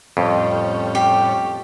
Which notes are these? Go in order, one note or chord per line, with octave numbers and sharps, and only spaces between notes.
F2 A2 G3 C#4
G4